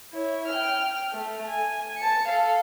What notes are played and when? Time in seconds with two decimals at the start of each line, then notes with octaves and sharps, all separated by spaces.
0.13 E4 C#5
0.48 G5 F6
1.11 A3
1.48 G#5
1.97 A5 C#7
2.28 A4 F5